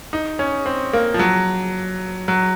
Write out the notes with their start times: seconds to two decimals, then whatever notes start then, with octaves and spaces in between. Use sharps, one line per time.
0.13 D#4
0.39 C#4
0.66 C4
0.93 A#3
1.14 F3
1.19 F#3
2.28 F#3